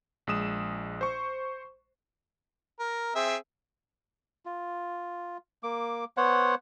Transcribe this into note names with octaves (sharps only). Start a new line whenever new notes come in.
A#1 G#3 D#6 E7
C5 C#6
A#4
C4 G#4 E5
F4
A#3 D6
B3 C5 C#5 F#5